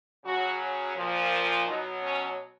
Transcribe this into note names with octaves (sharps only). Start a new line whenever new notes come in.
C#3 F#3 F#4
A#2 F3
B2 F#3 D#4
C#4